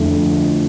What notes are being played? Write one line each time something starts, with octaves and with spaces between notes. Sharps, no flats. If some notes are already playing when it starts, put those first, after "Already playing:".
Already playing: F2 D3 A3 E4